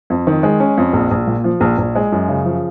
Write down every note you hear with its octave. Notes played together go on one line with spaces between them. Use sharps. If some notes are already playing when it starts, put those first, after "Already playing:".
F2
D#3
G#3
C#4
F2
A#1
A#1
A#2
F3
A#1
A#1
G#3
F#2
C#3
F3